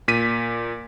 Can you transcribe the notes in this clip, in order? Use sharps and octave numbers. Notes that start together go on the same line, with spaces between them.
A#2 B6 D#7